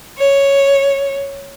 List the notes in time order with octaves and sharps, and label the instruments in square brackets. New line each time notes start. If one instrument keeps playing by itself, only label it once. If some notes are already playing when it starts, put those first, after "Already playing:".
[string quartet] C#5